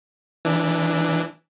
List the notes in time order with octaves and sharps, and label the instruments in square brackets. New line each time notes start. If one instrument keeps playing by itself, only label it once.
[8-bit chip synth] E3 D4